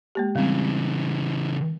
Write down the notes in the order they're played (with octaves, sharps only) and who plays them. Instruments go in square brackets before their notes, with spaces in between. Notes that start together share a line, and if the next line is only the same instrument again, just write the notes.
[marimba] G#3 A#3 G4
[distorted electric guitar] C#3 E3 [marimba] G3 C4